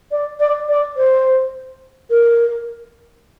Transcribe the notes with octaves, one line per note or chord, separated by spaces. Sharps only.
D5
D5
D5
C5
A#4